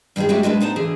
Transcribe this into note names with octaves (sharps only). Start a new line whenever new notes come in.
G2 D#3 C4 F4 G#4
G#3 A3 C#4 E4 F#4 G4
B2 G#3 D4 B4
B3 D#4 C5 A5
D3 E3 G#4